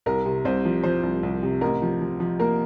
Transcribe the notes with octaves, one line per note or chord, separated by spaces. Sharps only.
C2 A#4
C3
C2 C5
F3
F3 C5
C2
C2
C3
A1 A#4
F3
F3
F3
A#3 A#4